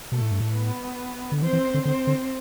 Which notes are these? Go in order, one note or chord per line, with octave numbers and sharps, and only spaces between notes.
B2 A3 A4
A2
G2
A2
B3 B4
D3
E3 C4 C5
E3
D3
D3 C4 C5
D3